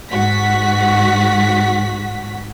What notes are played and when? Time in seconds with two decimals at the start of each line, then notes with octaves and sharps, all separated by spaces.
0.11 G#2 F#4 B6